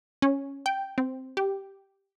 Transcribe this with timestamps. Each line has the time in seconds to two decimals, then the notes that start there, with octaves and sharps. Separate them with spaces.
0.22 C#4
0.66 G5
0.98 C4
1.37 G4